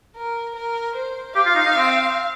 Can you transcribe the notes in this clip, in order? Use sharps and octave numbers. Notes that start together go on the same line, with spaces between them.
A#4
A#4
C5
G4 F5
F4
D#4
D#4
C4